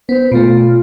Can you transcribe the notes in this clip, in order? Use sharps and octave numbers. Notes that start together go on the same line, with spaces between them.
B3 C5
B2 A3 F4